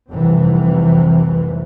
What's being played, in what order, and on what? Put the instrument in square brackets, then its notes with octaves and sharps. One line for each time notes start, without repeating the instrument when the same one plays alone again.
[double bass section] F1 C2 C3 E3